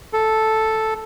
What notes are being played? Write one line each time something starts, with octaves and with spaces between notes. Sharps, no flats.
A4